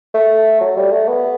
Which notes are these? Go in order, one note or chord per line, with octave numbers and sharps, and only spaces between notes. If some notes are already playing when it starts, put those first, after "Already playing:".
A3
F#3
G3
A3
B3